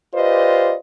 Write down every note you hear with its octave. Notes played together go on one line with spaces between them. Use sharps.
F4 G4 B4 C5 D5 D#5